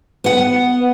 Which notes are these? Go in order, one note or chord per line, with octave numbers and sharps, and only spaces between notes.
B3 F#5